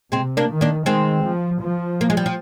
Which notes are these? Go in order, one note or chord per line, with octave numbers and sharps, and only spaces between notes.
C3 G#3 C4
A#3 D4
D#3
A#3 D4
D#3 G#3 C4
F3
F3
A#3
G#3
G3
F3